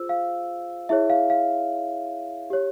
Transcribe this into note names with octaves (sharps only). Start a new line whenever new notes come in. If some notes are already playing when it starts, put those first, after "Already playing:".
Already playing: F4 G#4 C5 E6
F5
E4 G#4 C#5 E5
F5
F5
G4 C#5